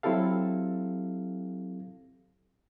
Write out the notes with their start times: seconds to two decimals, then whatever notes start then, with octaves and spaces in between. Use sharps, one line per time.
0.03 F#3 C4 E4 G4 A4 F5